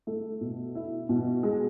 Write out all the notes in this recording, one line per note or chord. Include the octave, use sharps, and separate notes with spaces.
A3
B2
E4
B2
G#3